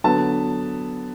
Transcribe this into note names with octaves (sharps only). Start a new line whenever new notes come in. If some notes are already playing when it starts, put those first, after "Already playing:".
D3 F#3 B3 A5